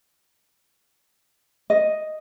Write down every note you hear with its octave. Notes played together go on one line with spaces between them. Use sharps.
D#5